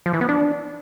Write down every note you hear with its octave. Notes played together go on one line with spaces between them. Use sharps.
F3
E3
B3
D4